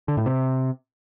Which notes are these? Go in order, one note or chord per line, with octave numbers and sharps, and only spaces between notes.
D3
A2
C3